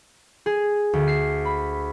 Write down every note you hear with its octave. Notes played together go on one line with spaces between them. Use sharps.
G#4
D2
C7
B5